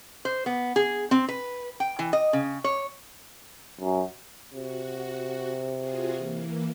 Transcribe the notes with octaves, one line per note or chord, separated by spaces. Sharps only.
C5
B3
G#4
C4
B4
G5
E3
D#5
C#3
C#5
F#2
C3 F#4
F4 F#4 G#4
E3 A#3